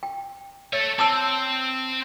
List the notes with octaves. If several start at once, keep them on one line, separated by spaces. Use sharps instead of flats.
G5
A4 C#5 E5
C4 A5 D#6 E6